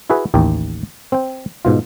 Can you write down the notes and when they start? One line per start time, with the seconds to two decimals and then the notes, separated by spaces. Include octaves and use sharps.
0.10 E4 F#4 G#4 B4
0.34 A1 D#2 G5
1.12 C4 G5
1.65 G#2 B2 F4